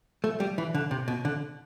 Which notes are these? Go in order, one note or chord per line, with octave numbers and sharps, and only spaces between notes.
A3
G3
E3
D3
C3
B2
D3